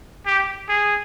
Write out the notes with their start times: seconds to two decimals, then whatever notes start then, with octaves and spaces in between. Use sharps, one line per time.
0.26 G4
0.69 G#4